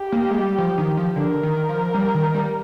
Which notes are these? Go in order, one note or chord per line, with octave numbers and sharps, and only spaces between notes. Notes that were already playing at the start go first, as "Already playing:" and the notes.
Already playing: G4
A#3
G#3
G3
F3
D#3
F3
D3 A#4
D#3
F3
G3
D#3
G3